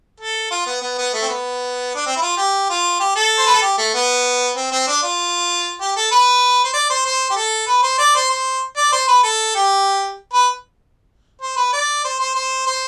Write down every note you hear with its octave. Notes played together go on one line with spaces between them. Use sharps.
A4
F4
B3
B3
B3
A3
C4
B3
D4
C4
E4
F4
G4
F4
G4
A4
C5
B4
A4
G4
A3
B3
C4
C4
D4
F4
G4
A4
B4
C5
D5
C5
C5
G4
A4
B4
C5
D5
C5
C5
D5
C5
B4
A4
G4
B4
C5
B4
D5
C5
C5
C5
C5